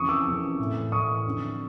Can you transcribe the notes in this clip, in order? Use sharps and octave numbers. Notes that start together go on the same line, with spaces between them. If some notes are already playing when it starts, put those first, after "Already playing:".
Already playing: F2 C#3 E3 C#6 D#6
D6 E6
F2 C#3 E3
A2 E3
A2 E3 C#6 D#6
F2 D3